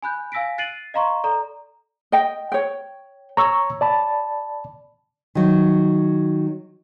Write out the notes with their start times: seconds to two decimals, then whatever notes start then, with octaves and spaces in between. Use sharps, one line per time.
0.02 G#5 B5 F#6 G6
0.32 F5 G#5 E6 A#6 B6 D7
0.58 F#6 A6 C7 D7 D#7 F#7
0.94 D#5 F5 A#5 C6 C#6
1.24 A4 D5 A#5
2.12 D#5 G5
2.52 C#5 G5
3.37 C#5 A#5 C#6 E6
3.81 D5 A5 B5
5.35 D#3 F#3